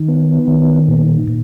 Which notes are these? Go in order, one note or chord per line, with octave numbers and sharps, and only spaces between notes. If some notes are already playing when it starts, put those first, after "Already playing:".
Already playing: D#3
B3
D#3
A#2
A#2